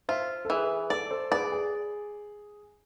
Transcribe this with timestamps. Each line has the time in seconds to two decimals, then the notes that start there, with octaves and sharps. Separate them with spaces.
0.09 F4 C5 E5
0.45 A4
0.50 E3 G#4 B4
0.90 A4 D5
1.11 A4 C5
1.32 G#4 B4 D5
1.52 G#4